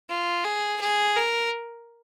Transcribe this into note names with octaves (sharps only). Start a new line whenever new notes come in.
F4
G#4
G#4
A#4